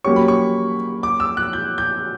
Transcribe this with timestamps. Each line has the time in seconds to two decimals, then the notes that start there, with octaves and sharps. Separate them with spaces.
0.04 F#3 A#3 C#4 G4 C#5 C#6
0.16 B5
0.28 C#6
1.03 D6
1.20 E6
1.37 F#6
1.53 G6
1.78 G6